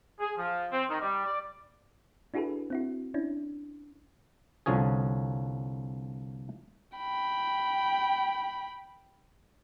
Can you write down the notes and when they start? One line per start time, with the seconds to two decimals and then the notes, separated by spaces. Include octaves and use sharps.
0.19 G#4
0.37 F3
0.72 C4
0.89 D#3
1.01 G3
1.25 D5
2.34 D4 E4 F#4 G#4 A4 B4
2.70 C4 E4 F#4
3.14 C#4 D4 E4
4.66 C2 D3 F3 C#4 G#4
6.98 G5 B5